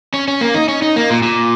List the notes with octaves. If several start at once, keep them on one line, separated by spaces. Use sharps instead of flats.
C#4
C#4
A#3
D#4
C#4
D#4
A#3
A#2
A#2